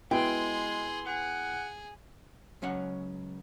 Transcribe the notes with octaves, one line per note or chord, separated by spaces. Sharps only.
G#3 B3 E4 F#4 G#4 G5 C6
G#4 F#5
C#2 F#3 C#4 F#5